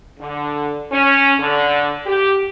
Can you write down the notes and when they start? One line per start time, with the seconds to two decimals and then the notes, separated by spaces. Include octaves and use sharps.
0.19 D3
0.92 C#4
1.40 D3
2.06 G4